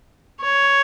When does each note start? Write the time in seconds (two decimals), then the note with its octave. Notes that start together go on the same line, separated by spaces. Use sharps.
0.42 C#5